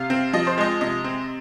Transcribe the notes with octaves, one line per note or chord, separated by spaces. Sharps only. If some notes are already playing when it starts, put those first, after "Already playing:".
Already playing: C3 F5
C4
F3 D#5
C5
G#3 D#5
C3 D#5
C4